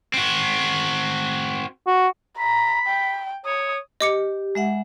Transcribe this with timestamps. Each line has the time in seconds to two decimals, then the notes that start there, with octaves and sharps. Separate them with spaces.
0.14 C4 F#4
1.87 F#4
2.39 A#5 B5
2.88 G5
3.46 C#5 D#6
4.01 G4 D#5 D6 C#7
4.55 G#3 E5 F#5